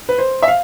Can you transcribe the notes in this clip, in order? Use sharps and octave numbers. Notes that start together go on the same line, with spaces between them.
B4
C5
E5
F5